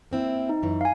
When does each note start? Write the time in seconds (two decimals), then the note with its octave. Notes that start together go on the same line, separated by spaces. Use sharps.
0.11 A#3 C4 E4
0.49 D#4
0.63 F#2 E3
0.81 F5 G#5